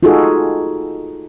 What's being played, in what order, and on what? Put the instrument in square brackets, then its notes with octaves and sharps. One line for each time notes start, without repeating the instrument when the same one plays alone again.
[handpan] D#4 F4 F#4 G#4 A4